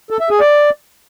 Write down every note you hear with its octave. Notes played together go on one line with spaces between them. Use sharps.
A4
E5
G#4
D5